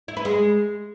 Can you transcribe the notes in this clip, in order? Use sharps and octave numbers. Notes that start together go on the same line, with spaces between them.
E4
B4
G#3